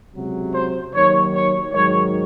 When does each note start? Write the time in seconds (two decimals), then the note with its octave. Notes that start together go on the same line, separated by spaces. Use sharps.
0.14 C#2 C3 F#3
0.53 C5
0.94 D#2 D#3 F#3 C#5
1.34 C#5
1.73 G#2 D#3 F#3 C#5